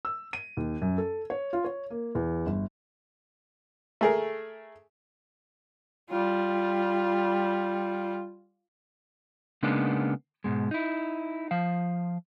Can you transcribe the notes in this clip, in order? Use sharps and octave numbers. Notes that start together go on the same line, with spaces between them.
E6
D#7
D#2
F#2
A4
C#5
F4
C#5
A#3
E2
G1
A3 G#4 A#4
G3 F4
C#3 G#3 A#3 B3 D4 D#4
G#2 B2 G#3
D#4 E4
F3 F5